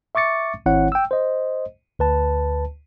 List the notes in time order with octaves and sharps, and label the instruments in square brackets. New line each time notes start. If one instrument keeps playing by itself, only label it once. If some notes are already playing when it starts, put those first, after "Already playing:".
[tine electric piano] E5 C#6 D6 A6 C#7
G#1 D#3 C4 E4 C#5 F#5
G5 E6
C5 D#5
D2 B4 A5